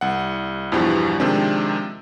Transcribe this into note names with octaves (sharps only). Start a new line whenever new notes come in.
C2 F#5
E2 G2 B2 E3 F3 G3
C3 D#3 F3 G#3 C4 D4